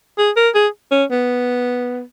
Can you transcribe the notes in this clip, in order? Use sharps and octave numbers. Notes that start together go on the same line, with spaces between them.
G#4
A#4
G#4
C#4
B3